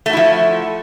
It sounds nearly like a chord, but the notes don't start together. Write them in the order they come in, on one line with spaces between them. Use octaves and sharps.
A3 F#4 E4 F3